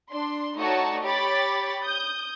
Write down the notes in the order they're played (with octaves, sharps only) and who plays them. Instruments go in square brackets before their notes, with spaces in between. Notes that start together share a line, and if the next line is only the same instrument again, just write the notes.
[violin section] D4 C6
A3 D#4 F#4 C#5 D5 A5
G4 C#5 B5 D6 A6
D#6 G6